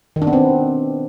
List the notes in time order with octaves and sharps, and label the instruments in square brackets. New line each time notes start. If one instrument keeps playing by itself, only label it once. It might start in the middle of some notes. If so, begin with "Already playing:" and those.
[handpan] D#3
D4
B3
C4